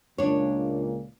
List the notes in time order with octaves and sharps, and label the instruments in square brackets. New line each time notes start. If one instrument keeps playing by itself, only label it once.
[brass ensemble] C#2 A#2 [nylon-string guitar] D4 C#5